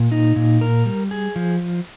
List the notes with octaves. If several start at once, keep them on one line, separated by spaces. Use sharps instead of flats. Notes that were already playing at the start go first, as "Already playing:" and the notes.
Already playing: A#2
D#4
A#2
A#4
G3
G#4
F3